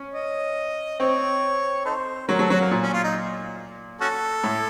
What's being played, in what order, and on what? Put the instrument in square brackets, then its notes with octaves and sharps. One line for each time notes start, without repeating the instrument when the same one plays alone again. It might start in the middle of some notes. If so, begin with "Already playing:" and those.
Already playing: [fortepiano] C#4
[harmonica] D#5
[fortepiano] C4 [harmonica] C#5
[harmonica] D#4 A4 C5
[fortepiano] F#3 [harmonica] A#4
[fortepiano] F#3 [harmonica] A4
[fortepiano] F#3 [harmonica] F#4
[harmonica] A#3
[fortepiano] A#2
[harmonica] C#4
F4
D#4
C#4 F#4 A4
[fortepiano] A2